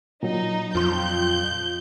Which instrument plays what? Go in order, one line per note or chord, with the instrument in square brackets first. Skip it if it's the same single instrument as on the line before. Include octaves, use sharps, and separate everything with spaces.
[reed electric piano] A#2 F#3 [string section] D#4
[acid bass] F2 [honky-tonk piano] F3 C6 [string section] G6